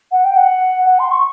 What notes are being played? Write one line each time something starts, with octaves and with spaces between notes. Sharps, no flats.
F#5
G5
F#5
F#5
C6
C#6